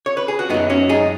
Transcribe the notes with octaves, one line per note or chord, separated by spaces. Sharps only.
C#5
B4
G#4
F#4
F#2 F#3 B3 D#4
C#4 F#4
D#4 G#4